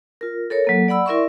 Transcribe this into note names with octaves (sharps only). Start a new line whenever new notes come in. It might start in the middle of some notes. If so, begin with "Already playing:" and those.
F4 A#4
A4 A#4 C#5
F#3 A#3 A4
D5 F#5 B5 E6
E4 A#4 D5 E5 C6 C#6